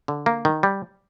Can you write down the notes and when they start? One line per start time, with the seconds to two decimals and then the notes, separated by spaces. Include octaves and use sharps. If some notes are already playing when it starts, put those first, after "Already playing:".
0.08 D3
0.26 A#3
0.45 D#3
0.63 G3